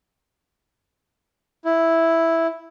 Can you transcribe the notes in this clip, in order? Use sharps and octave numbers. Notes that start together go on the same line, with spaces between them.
E4